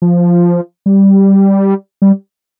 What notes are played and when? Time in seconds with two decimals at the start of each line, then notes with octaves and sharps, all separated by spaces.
0.02 F3
0.86 G3
2.02 G3